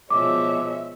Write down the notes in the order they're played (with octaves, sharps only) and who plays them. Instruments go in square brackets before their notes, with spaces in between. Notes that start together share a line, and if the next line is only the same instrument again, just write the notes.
[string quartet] B2 F3 G#3 [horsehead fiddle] C#5 E5 [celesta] D6